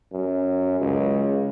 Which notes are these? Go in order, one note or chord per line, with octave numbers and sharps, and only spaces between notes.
F#2
C#2